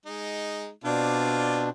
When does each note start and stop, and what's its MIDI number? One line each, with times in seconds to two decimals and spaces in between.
0.06 0.69 56
0.06 0.69 63
0.84 1.70 47
0.84 1.70 60
0.84 1.70 62
0.84 1.70 65
0.84 1.70 74